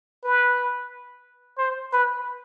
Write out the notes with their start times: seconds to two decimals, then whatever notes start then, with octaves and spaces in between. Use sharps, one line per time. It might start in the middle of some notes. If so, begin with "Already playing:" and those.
0.24 B4
1.58 C5
1.93 B4